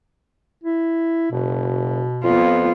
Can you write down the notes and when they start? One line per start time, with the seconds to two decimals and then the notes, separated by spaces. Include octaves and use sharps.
0.63 E4
1.32 F#1 B2
2.24 F2 B3 F4